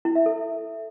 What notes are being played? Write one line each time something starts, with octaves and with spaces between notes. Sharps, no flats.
E4
E5
A4